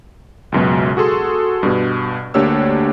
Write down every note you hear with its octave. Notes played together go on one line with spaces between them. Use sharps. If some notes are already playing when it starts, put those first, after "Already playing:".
C#2 F#2 B2
F#4 G#4 A4 C6
G2 B2
D2 A#3 D4 G4 C#5 E6